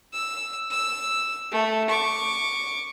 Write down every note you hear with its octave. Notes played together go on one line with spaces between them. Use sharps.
E6
E6
A3
C#6 D6